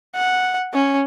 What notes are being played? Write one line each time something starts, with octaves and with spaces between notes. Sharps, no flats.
F#5
C#4